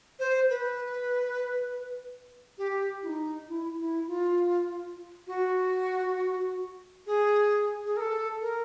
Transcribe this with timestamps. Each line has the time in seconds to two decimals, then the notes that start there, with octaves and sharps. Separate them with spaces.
0.19 C5
0.50 B4
2.58 G4
3.03 E4
3.07 D#4
3.48 E4
3.78 E4
4.07 F4
5.27 F#4
7.07 G#4
7.84 G#4
7.97 A#4
8.00 A4
8.41 A#4